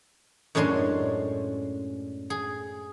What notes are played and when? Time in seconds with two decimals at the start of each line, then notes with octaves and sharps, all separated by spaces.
0.55 F#2 A2 G#3 C#4 D4 C6
2.30 G#4